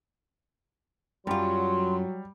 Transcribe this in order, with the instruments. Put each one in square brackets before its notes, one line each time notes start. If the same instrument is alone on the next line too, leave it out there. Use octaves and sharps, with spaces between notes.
[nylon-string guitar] F#2 F4 [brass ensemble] F#3 [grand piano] G3 [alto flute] C6